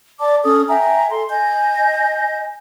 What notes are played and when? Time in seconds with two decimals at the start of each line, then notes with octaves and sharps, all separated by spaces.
0.20 D5 A5 D6
0.44 C#4 A4 D#6
0.68 E5 G5 G#5 A#5
1.10 A4 C6
1.29 D#5 G#5 G6